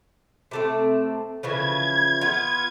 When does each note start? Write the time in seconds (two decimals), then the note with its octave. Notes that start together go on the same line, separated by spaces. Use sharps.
0.51 C3 A3 C4
1.43 C#3 E3 F3 G#6
2.21 B3 F4